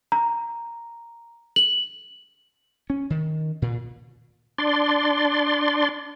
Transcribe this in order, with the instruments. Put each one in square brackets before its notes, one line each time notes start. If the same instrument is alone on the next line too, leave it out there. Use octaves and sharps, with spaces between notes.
[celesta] A#5
F#7
[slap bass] C#4
D#3
A#2
[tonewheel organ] D4 D5 C6